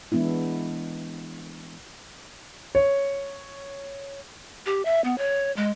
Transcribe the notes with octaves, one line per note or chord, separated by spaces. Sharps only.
E3 G#3 B3 D4 E4
C#5
G4
E5
B3
C#5
G#3